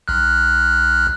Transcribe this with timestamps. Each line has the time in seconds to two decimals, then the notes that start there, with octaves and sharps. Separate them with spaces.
0.08 B1 F6 F#6